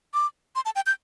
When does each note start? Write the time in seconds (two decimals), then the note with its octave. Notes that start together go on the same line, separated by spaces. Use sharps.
0.14 D6
0.56 C6
0.65 A5
0.76 G5
0.86 G6